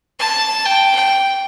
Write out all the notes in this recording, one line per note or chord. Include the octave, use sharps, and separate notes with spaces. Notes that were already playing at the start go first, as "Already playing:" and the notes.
A5
G5
G5